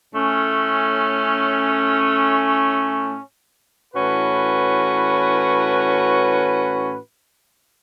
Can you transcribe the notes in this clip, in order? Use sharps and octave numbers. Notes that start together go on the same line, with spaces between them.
A2 A3 C#4
A2 E3 C#4 F#4 B4